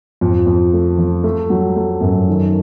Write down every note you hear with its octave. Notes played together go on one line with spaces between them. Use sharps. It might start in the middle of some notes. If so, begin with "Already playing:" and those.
F2
F2
A3
F3
A3
F#3
A3
F#2
D#3